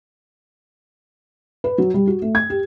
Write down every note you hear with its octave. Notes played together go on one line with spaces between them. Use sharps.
B4
F#3
G3
F#4
A3
G#6
G4